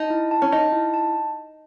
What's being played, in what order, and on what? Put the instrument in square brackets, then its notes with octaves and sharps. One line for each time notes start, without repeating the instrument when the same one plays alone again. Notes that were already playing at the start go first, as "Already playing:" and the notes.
Already playing: [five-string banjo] D#4 [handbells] A5
[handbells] E4
A5
[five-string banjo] C#4
[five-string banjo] D#4 [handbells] A5
[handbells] E4
A5